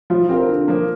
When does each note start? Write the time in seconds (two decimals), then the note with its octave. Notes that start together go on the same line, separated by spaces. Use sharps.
0.10 F3 F4
0.29 C4 G4 A#4
0.49 D3
0.68 F3 A#3